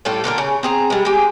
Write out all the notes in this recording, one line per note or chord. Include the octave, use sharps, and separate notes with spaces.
A2 G3 F4 A4
A#2 D3 D4 A#4
C#3
C4 G#4 A#5
G3 G#3
G#3 G4